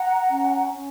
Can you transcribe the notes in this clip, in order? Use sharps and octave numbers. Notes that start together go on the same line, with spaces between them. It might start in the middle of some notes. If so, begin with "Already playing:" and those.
Already playing: F#5 A#5
C#4
C#4